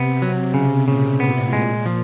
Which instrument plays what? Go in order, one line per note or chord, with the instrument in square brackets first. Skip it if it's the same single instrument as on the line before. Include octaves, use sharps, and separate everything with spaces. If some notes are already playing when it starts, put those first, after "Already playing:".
Already playing: [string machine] C3 [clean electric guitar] B3
[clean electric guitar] F#3
C#3
[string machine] A#2 [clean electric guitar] C#3
[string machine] A2 [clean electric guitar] B3
[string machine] A#2 [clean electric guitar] G#3
[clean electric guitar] F3